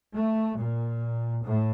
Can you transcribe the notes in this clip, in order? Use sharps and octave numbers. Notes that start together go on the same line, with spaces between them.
A3
A#2
A2